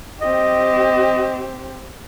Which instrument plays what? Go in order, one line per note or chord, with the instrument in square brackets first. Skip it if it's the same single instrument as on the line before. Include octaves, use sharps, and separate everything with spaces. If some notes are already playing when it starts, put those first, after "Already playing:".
[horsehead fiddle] C4 G4 [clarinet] D#5